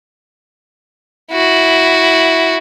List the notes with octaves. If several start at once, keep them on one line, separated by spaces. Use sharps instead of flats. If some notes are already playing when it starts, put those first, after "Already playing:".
E4 F#4